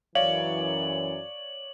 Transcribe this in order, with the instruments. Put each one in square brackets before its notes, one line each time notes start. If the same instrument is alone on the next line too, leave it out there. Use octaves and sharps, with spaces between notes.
[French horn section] F#2 E3 [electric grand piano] C#5 D5 [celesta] F5 [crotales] F#7